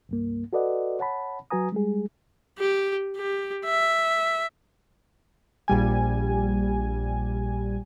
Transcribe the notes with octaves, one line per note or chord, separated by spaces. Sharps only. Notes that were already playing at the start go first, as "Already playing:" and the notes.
C2 G2 A#3
F#4 A4 B4 D5 D#5 F#5
C#5 F#5 A5 B5
F#3 F#4 B4 G#5 A#5 D#6
G3 G#3 G#4
G4
G4
E5
A#1 G3 G#5